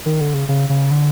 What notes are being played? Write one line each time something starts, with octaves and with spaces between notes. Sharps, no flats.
D#3
D3
C#3
C#3
C#3
D3